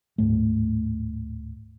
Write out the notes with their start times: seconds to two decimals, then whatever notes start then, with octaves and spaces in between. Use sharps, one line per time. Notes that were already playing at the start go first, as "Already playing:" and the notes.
0.18 D1 G#1 G#2 A3